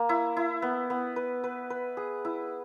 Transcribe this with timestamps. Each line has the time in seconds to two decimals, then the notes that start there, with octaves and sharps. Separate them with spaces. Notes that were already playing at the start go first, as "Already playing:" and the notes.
Already playing: A#3
0.09 E4
0.37 E4
0.62 B3
0.90 B3
1.16 B4
1.44 B4
1.70 B4
1.97 G#4
2.25 E4